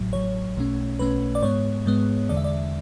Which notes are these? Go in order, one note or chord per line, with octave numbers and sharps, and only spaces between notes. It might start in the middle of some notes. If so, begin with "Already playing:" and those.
Already playing: A1 A2 F#3
A1 A2 F#3 C#5
B1 B2 A3 C#4
B1 B2 A3 C#4 B4
D5
G#2 G#3 B3 C#5
G#2 G#3 B3
E2 D3 G#3 D5
E5
D5